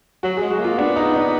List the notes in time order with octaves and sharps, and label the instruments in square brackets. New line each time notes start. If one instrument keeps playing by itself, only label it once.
[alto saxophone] F#3 [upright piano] F#4
[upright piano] G#4
[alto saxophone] G#3
[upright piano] F#4
[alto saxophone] A#3 [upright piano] F4
[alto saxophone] B3 [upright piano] D4
[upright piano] D#4
D4